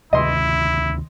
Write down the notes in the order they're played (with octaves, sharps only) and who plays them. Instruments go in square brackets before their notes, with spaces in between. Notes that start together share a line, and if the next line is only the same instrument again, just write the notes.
[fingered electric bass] D2 C3 D#3 [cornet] E4 [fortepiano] D#5 C6